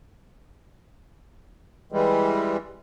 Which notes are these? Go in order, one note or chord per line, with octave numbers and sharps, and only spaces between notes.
E3 G3 G#3